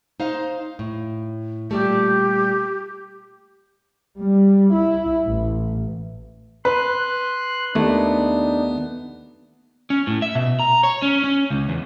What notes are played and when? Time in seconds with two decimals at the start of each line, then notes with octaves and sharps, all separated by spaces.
0.20 D#4 C5 F5
0.79 A2
1.71 A#2 G3 A3 G4
4.18 G3
4.73 E4
5.26 A1
6.65 B4 C6 F#6
7.75 D#2 A3 B3 D4 D#4
9.90 C#4
10.07 A2
10.22 E5
10.35 B2
10.60 A#5
10.83 C#5
11.02 C#4
11.24 C#4
11.50 C#2
11.69 E2